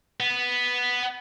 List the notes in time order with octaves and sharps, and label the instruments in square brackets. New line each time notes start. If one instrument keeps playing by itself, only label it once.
[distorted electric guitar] B3